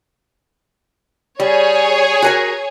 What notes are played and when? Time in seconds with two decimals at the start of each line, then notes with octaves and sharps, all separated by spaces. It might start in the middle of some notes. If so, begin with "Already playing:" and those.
1.40 G3 G#4 C#5
2.22 F#4 A#4 G#5